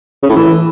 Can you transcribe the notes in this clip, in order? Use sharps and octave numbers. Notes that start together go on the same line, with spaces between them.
C#3
A2
E3